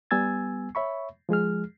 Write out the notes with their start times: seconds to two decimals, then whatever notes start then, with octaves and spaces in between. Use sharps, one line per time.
0.11 G3 B3 G#5 E6 G#6 A6
0.75 C#5 E5 B5 C#6
1.29 F3 G#3 G#4 F6